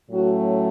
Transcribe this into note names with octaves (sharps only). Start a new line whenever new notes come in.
A2 F#3 A3 C#4 F#4